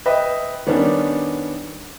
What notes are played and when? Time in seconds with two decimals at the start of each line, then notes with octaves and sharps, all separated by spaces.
0.06 B4 D#5 E5 G5 B5 D#6
0.67 D#3 G3 B3 C#4 D4